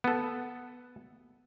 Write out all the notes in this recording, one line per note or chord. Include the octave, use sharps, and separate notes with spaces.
B3 A4